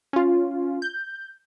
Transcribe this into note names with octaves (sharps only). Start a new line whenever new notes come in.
C#4 F4
G6